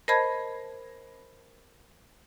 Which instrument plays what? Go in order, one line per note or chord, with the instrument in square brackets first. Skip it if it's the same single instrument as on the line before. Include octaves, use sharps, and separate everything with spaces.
[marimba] A#4 C5 D#5 A5 B5 G#6